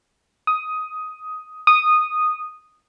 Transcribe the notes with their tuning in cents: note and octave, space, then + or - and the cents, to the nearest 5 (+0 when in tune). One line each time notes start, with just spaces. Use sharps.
D#6 +10
D#6 -10